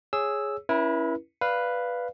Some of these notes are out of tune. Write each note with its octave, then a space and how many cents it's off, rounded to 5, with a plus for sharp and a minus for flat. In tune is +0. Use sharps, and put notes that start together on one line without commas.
G#4 +0 C#5 +0 E6 +0
C#4 +0 E4 +0 B4 -45
B4 +0 D5 +10 F5 -5